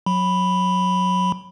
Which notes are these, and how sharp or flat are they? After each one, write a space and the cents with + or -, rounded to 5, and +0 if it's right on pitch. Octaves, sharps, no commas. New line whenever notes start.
F#3 -20 B5 +0